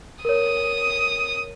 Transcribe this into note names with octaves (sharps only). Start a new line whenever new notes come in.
A#4 C#5 D#6